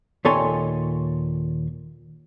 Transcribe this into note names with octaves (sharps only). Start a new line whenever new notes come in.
D#2 A#2 A4 C#5 G#5 C6